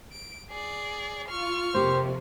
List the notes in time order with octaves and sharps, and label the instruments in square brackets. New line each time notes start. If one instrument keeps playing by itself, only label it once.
[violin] D7
G#4 D5
[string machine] F4 [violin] C#6 F6
[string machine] F2 C3 [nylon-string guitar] A#3 G4 [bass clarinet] C5